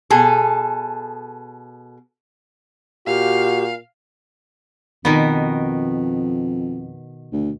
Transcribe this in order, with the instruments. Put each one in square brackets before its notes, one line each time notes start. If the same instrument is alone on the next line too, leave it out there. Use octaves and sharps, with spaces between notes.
[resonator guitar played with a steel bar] B2 G#4 A4
[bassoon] A#2 [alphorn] F#4 [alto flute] G4 [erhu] F5
[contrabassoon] F2 [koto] B2 D#3 B3
[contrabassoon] D2